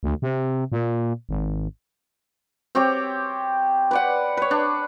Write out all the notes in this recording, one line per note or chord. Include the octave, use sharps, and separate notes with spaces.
D2
C3
A#2
G#1
C4 G4 C#5 D6
B4 D5 F#5
B4 C#5
D4